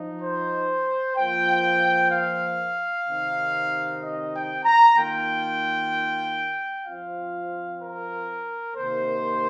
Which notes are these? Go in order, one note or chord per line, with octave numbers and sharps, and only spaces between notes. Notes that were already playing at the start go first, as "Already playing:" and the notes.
Already playing: F3 D#4
C5
F3 A#3 F4 G5
F5
C3 D#3 C4 D#4
D#5
G5
A#5
D#3 A#3 F4 G5
F3 C4 F4 F5
A#4
C3 D#3 A#3 C5